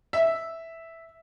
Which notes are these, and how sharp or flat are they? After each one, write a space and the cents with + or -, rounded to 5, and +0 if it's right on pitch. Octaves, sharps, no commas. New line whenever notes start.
E5 -5